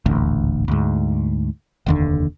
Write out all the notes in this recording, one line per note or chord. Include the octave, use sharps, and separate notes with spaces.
D#1 A1 D2
D2 G#2
F1 D#2 D3